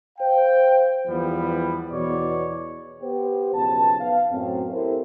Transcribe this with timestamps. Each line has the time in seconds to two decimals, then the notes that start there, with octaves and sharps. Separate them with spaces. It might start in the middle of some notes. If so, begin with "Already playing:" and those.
0.18 C5 F5 G5
1.08 E2 F3 G3 B3
1.91 E2 B2 C#5 D5
3.02 B3 G4 C5
3.54 B1 F2 C#3 A5
4.00 B3 F5
4.31 F#2 A2 C4
4.72 E4 G4 A4 A#4 C5